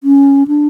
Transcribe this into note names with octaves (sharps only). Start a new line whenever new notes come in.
C#4
D4